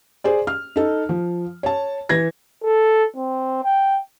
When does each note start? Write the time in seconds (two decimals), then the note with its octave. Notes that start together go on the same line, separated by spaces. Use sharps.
0.24 G#4 C5 D5
0.47 F6
0.76 D#4 A4
1.09 F3
1.63 C#5 A5
2.09 E3 G#6 A#6
2.63 A4
3.17 C4
3.64 G5